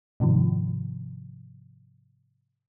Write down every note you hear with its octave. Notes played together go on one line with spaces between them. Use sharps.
G#2 C3 D#3 F3